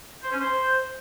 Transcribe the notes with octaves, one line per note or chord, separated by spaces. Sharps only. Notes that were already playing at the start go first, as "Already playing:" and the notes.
C5
C#4
C5